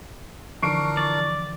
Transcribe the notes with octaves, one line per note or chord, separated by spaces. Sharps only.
D3 E3 F3 D4 A#4 C#6 C7 D7
D5